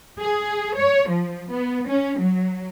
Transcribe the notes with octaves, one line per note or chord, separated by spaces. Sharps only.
G#4
C#5
F3
B3
C#4
F#3